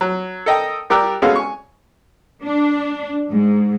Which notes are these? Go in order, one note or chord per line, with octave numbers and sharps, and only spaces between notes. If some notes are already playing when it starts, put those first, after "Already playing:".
F#3
A4 A#4 D#5 G5
G3 G4 A#4 D5 E6 F#6
G#3 B3 C#4 F#4 A4 F5
G#5 C#6
D4
G#2